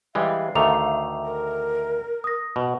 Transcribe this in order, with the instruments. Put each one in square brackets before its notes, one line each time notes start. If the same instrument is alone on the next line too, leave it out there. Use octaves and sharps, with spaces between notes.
[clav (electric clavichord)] E3 G3 G#3 [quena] F5
[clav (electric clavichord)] D2 D#3 A3 [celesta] A#5 D6 F7
[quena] A#4
[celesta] D#6 A#6
[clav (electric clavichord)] B2